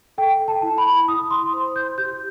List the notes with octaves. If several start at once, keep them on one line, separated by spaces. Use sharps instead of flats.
A4 G5
A5
E4
B5
E4 D#6
C6
C5 C6
G6
G4 G6